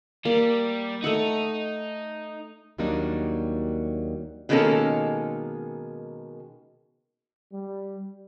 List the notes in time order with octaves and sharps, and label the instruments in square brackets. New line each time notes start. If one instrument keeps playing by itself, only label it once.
[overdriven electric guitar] G3 [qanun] A#3
[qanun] A3 E5 F#5 [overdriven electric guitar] D#4
[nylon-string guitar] D#2 F#3 G3 A#3 D4 D#4
[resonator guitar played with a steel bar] B2 D#3 G#3 A#3 C#4 A4
[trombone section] G3